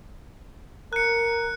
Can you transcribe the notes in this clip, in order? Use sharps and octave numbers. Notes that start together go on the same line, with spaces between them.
A#4 F#6 C#7